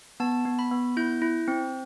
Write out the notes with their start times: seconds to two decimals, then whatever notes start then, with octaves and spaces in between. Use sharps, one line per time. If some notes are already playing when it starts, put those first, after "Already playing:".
0.20 B3 A5
0.45 B3
0.59 B5
0.71 B3
0.97 E4 G6
1.22 E4
1.48 C4